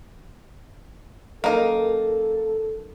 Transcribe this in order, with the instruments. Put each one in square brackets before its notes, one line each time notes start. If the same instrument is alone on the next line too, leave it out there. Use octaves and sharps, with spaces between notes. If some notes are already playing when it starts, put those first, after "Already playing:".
[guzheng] F#2 D#3 [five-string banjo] A#3 D#4 [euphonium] A4